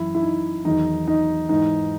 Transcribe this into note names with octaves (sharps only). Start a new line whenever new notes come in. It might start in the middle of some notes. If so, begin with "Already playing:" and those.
Already playing: F#2 E3 E4
E4
D#4
E2 D#3 F#3 D#4
D#4
G#2 E3 D#4